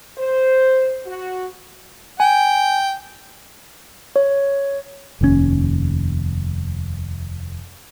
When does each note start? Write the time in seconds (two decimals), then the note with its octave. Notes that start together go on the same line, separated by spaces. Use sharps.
0.18 C5
1.06 F#4
2.20 G5 G#5
4.16 C#5
5.21 F1 D#2 A#2 C#4